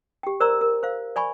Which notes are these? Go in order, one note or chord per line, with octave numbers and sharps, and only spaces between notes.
G4 G5
A#4 C5 D5 A#5 E6
A#4
C5 F5
D5 G#5 B5 C#6